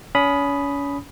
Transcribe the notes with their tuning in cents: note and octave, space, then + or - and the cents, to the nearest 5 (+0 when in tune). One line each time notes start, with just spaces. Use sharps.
C#4 +35 B5 +0 D#6 +0